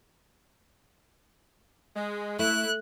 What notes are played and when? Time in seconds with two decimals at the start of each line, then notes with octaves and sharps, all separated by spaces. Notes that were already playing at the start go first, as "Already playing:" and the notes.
1.94 G#3
2.39 A3 E4 F#6